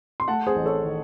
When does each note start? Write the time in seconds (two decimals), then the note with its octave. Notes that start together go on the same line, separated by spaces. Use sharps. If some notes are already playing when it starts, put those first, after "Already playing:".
0.20 C6
0.28 A3 F#5 A5
0.47 G#4 C5
0.56 A1
0.66 A4 C#5
0.84 D#3